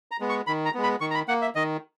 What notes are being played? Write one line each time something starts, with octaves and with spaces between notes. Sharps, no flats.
A#5
G#3 B3
C#6
D#3 B5
A#5
G#3 B3
B5
D#3 C#6
A#5
B5
A#3 F#5
E5
D#3 D#5